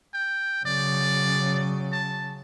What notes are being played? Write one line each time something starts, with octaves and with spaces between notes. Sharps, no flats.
G5
C#3 F#3 D5
A5